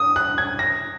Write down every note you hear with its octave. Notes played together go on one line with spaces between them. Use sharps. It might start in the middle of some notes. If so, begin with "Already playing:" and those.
Already playing: D#6
F#6
G#6
A#6